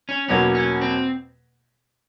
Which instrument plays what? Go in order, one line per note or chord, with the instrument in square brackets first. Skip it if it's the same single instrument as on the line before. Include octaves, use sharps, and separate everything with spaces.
[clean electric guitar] C#4
[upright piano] E2 B2 F#3 A#3 [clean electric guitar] C#4
[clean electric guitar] C#4
C4